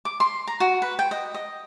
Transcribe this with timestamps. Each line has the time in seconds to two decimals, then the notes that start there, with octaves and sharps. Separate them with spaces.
0.05 D6
0.20 C6
0.47 A#5
0.60 F#4
0.82 B4
0.99 G5
1.11 D#5
1.34 D#5